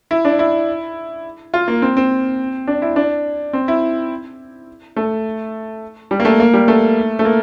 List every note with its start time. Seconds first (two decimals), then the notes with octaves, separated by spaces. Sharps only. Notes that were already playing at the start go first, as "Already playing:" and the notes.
0.11 E4
0.25 D4
0.39 E4
1.54 F4
1.68 A#3
1.82 C4
1.97 C4
2.67 D4
2.82 E4
2.96 D4
3.53 C4
3.68 E4
4.96 A3
6.11 G3
6.20 A#3
6.25 A3
6.40 A#3
6.54 G3
6.68 A3
7.19 A3
7.25 A#3